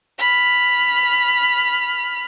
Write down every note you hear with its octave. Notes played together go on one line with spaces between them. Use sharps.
B5 F6